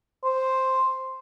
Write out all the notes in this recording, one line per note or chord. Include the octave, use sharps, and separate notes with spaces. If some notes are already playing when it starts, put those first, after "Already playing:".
C5